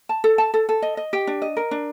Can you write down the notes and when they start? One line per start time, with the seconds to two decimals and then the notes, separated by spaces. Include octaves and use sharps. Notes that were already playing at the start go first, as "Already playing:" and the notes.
0.09 A5
0.24 A4
0.38 A5
0.54 A4
0.69 A4
0.82 D#5
0.97 D#5
1.13 G4
1.27 D4
1.42 D#5
1.57 A#4
1.71 D4